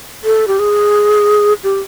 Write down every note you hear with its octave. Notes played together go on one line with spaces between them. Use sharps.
A4
G4
G#4
G4